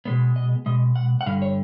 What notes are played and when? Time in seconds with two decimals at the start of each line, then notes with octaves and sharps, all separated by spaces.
0.05 B2 G#3 B3
0.36 D#5
0.66 B2 G#3 D#5
0.96 F#5
1.21 F#5
1.26 G2 D3 G3 F5
1.42 C#5